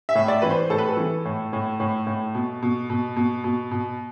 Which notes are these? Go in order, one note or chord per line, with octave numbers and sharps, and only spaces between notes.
E5
A2
D5
E3 B4
C5
A2 A4
B4
A4
E3
A2
A2
A2
A2
B2
B2
B2
B2
B2
B2